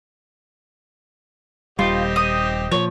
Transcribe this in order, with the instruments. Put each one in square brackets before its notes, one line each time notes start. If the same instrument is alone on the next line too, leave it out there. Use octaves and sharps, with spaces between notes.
[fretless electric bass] D#1 G3 [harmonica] C4 D#4 G4 [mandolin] F4
[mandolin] D#6
[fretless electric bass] A#2 F3 [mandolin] C#5